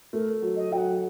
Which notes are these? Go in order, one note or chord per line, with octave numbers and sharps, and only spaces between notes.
A3 A#4
F#3
D#5
F#3 G5
F#5